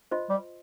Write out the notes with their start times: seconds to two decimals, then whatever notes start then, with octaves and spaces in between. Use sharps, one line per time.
0.11 F4 C5 D#5 A5 C6
0.30 G3